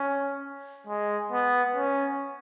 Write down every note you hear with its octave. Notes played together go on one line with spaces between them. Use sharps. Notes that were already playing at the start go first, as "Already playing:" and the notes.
Already playing: C#4
G#3
B3
C#4